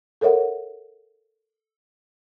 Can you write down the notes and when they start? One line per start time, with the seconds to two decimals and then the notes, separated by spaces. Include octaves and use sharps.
0.21 A4 A#4 C#5 E5 F#5